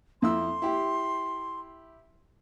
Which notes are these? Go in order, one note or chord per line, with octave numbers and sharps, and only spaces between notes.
F2 E4 C6 E6
E4 G4